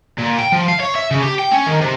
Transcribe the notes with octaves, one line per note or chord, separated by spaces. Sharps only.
A#2
G5
F3
F5
C#5
E5
C#3
G4
G5
C#4
D#3
C3